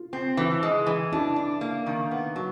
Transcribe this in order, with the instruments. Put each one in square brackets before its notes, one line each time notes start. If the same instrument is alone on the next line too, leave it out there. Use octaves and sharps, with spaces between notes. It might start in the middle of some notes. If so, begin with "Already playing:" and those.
Already playing: [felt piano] F4
[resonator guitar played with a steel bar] C4
[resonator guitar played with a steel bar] E3 [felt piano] E4
[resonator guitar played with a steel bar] G#3
E3
[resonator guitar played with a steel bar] D4 [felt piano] E4
[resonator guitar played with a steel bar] D4
A#3
D#3
B3
F#3